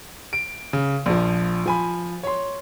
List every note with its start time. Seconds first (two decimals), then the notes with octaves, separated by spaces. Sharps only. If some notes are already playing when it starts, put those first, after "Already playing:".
0.33 D7
0.73 C#3
1.06 A#1 F3
1.66 F3 G#5 B5
2.23 C#5 C6